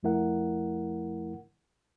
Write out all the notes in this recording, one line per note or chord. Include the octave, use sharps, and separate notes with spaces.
F2 F3 A3 E4 A#4 F#5